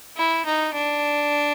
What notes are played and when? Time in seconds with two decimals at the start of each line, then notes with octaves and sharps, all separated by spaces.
0.17 E4
0.46 D#4
0.74 D4